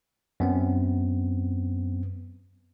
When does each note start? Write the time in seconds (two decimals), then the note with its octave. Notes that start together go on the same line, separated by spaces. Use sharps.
0.40 F#2 B3 C4